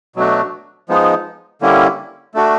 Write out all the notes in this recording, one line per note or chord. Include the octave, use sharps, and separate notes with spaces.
B2 F#3 A3 D4 F#4
F3 G#3 B3 D#4
D3 G3 A#3 C#4 E4
A3 D4 F#4